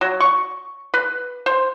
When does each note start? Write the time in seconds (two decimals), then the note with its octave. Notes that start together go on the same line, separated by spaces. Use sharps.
0.01 F#3
0.20 C#6
0.94 B4
1.46 C5